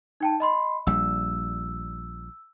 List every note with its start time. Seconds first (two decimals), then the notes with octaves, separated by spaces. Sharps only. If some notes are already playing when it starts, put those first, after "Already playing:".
0.20 D#4 G5 A5
0.40 D#5 B5 C6
0.87 A#1 G3 E6